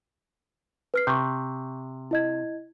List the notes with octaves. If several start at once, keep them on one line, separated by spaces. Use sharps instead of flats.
B4 F6 C7
C3 C#6 G6
E4 D#5 G#6